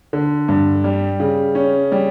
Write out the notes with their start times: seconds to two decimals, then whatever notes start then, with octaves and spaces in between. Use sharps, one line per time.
0.13 D3
0.48 G2
0.84 G3
1.20 C#3
1.55 C#4
1.92 G3